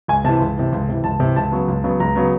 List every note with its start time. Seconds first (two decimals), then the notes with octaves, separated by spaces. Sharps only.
0.08 C#2 G#5
0.25 C3 E3 A5
0.40 C#2
0.57 C3 E3
0.72 C#2
0.89 C3 E3
1.04 C#2 A5
1.20 C3 E3
1.36 C#2 A5
1.52 C#3 F#3 B3
1.68 C#2
1.84 C#3 F#3 B3
2.00 C#2 A#5
2.16 C#3 F#3 B3